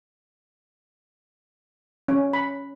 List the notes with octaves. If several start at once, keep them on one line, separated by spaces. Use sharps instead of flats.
C#4
B5